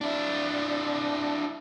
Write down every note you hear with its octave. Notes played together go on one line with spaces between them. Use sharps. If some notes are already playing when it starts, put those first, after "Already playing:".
D4 E4